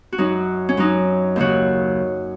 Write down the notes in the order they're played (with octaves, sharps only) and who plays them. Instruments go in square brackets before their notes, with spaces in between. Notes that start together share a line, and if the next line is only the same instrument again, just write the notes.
[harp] F#4
F#2 F#3 D#4
C#4
F#2 F#3 D#4
D#2 C#3 F#3 F#4